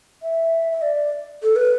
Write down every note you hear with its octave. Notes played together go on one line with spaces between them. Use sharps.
E5
E5
D5
A4
B4